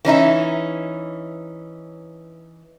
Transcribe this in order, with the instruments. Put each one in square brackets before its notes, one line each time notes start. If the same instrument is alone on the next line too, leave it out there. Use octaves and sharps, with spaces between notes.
[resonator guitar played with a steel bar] E3 C#4 D#4 E5